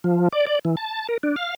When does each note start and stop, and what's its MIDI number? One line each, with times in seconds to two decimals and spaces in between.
0.04 0.28 53
0.33 0.46 74
0.47 0.59 74
0.65 0.76 52
0.77 1.07 81
1.09 1.17 70
1.23 1.36 62
1.36 1.55 77